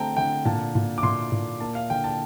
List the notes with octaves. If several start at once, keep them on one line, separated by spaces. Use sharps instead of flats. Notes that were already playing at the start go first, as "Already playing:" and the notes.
Already playing: D3 A3 C4 G5 A5 A#5
D3 G5
A#2 A5
A#2
D6
A#2 C6
A#2
A#3 A5
F5
D3 G5
A5